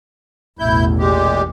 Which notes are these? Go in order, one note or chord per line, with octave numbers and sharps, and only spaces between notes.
A1 E2 B2 E4 G6
A#2 G#3 G4